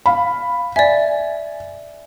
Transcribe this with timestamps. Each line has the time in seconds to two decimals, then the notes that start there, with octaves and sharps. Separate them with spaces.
0.06 F5 B5
0.76 D5 E5 G#5